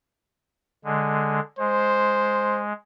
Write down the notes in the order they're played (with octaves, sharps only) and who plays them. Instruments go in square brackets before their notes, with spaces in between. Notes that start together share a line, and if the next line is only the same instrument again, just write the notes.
[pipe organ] D3 G#3
[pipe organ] G#3 [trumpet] C5